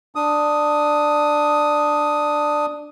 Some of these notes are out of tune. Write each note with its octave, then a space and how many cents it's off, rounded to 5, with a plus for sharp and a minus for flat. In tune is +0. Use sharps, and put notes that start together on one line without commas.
D4 +10 D#6 +5